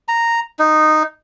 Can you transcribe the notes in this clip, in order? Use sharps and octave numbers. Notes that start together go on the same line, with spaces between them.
A#5
D#4